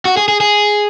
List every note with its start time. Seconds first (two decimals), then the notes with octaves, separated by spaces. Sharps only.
0.05 F#4
0.17 G#4
0.28 G#4
0.41 G#4